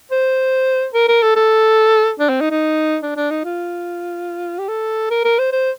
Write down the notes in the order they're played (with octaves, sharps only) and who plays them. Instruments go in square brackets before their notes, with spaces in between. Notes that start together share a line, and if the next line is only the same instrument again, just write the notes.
[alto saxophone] C5
A#4
A#4
A4
A4
D4
C4
D#4
D#4
D4
D4
D#4
F4
G4
A4
A#4
A#4
C5
C5